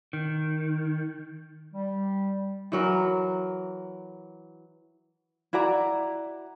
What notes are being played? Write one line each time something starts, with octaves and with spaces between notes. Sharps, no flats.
D#3
G3
E3 F#3 A#4
E4 F#4 D5 A#5